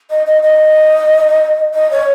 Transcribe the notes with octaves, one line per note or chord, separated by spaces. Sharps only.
D#5
D#5
D#5
D#5
C#5